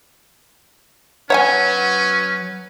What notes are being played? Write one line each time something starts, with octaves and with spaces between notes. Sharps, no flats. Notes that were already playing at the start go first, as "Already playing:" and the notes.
F#3 C#4 B4 C#5 E5 F#5 G#5